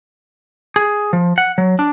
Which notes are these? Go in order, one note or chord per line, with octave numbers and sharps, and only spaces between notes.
G#4
F3
F#5
F#3
D4